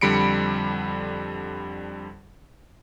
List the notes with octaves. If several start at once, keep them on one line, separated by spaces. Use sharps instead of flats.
F2 D3 G3 B5 C#7 D7